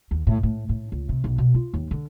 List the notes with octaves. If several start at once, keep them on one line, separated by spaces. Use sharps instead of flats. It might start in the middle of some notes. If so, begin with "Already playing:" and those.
D#2
A2
A2
A2
C#2
C3
B1
B2
F4
D#2
D3